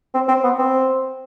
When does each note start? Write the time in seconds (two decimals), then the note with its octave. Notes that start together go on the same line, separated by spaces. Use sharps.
0.14 C4
0.28 C4
0.44 B3
0.59 C4